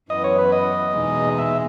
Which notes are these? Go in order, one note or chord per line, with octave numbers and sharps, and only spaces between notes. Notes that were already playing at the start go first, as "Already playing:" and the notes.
F#2 E3 B3 D#5
C#5
B4
D#5
E2 B2 G#3 D#4
E5